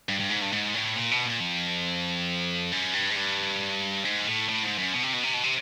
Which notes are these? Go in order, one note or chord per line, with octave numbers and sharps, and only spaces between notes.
G2
G2
G#2
G2
G#2
A2
A#2
B2
A#2
F2
F#2
G2
G#2
G2
G#2
A2
A2
G#2
F#2
B2
C3
B2
C3
B2
C3